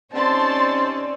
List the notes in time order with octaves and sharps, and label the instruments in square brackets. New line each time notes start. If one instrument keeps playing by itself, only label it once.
[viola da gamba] C4 C#4 [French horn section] D#4 G4 D5 [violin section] A5 C6